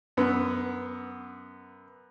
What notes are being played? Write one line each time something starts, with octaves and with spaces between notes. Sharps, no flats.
F#2 B3